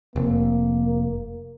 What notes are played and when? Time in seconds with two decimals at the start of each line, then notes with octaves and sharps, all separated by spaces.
0.16 F1 A#3